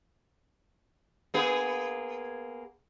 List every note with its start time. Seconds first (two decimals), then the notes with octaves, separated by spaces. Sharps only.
1.34 A#3 B3 G#4